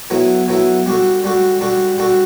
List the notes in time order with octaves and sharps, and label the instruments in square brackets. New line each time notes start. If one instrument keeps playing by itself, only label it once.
[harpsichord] F#3 B3 E4 A4
F#3 B3 E4 A4
G3 D4 F#4 A4
G3 D4 F#4 A4
G3 D4 F#4 A4
G3 D4 F#4 A4